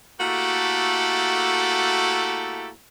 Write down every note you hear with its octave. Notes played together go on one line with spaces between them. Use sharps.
A3 A#3 E4 F#4 G4 A4